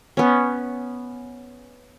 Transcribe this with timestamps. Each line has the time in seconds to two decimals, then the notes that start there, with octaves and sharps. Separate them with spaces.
0.17 B3 C#4